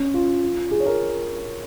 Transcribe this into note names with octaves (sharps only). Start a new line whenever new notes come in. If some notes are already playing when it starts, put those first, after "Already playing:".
Already playing: C#4
F4
G#4
C#5
A#4